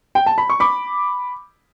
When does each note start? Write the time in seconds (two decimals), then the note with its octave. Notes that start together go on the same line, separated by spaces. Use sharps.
0.15 G5
0.26 A5
0.38 B5
0.50 C#6
0.60 B5 D6